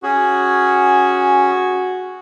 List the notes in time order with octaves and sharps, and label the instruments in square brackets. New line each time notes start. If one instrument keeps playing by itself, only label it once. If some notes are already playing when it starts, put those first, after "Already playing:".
[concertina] C#4 G#4 [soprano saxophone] F#4